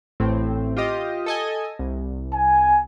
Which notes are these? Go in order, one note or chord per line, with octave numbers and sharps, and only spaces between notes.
A1 A2 C4
F4 G4 D#5
A4 D#5 G#5
C2
G#5